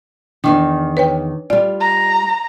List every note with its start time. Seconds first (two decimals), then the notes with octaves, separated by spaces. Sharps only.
0.44 E2 G#2 D#3 D4
0.97 B4 C#5 G5
1.50 G3 F4 D5
1.81 A#5